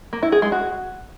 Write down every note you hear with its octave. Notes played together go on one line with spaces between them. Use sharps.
A#3
E4
G#4
G#3
F#4